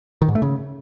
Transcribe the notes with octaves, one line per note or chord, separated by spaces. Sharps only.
D#3
G#2
A3
C#3